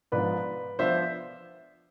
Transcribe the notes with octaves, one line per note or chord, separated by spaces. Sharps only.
G#2 F3 B3 D4 F4 B4 D5
F3 B3 D4 F4 C5 E5